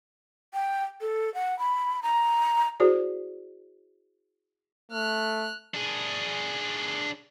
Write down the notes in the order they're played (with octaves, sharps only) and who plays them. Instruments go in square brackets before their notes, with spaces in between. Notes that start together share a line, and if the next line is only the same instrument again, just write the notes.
[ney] G5
A4
F#5
B5
A#5
[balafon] E4 F#4 G#4 C5 D5
[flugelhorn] A3 [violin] F6 F#6
[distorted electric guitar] D4 G#4